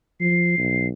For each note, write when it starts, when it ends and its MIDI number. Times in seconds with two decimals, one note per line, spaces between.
0.21 0.53 53
0.21 0.87 96
0.58 0.91 35